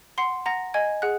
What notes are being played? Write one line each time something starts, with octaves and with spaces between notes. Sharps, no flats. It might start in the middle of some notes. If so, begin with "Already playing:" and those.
F#5 C6 C7
F#5 A#5 A#6
D#5 G#5 G#6
G#4 F#5 F#6